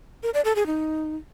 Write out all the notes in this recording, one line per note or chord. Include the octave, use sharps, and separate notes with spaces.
A#4
D5
A4
G#4
D#4